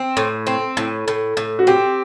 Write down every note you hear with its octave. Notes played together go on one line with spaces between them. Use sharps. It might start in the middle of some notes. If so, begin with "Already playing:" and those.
Already playing: C4
A2
C4
A2
A2
A2
F#4
C4 G4